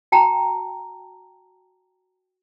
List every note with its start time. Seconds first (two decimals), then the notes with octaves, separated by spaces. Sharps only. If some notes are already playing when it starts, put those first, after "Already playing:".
0.12 F#4 G5 A5 A#5